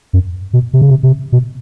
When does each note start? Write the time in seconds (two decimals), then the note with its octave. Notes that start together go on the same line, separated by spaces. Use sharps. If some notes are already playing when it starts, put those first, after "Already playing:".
0.13 F#2
0.53 B2
0.73 C3
0.81 C#3
0.90 C3
1.03 C3
1.32 B2